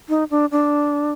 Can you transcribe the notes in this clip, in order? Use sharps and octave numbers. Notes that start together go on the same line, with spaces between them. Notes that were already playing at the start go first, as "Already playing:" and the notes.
D#4
D4
D4